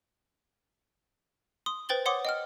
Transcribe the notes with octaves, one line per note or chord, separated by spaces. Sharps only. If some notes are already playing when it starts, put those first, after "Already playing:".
C6 D#6
B4 C5 G5 A6 F#7 G7
C#5 F#5 C6 D6 D#6
D#5 G5 F6